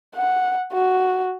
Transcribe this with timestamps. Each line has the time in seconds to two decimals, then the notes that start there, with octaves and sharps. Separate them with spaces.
0.16 F#5
0.73 F#4